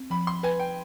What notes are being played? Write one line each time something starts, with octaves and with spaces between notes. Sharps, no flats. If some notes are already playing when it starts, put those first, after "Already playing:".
Already playing: C4
F3 B5
C6
B4 G#5
G5